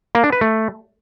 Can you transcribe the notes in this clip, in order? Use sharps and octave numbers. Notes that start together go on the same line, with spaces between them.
A#3
D4
B4
A3